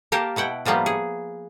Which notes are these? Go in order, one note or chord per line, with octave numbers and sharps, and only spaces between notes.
A#3 G4 A#4 A5
B2 E4 F#5 G5
A2 F3 G3 A#3 B3
G#4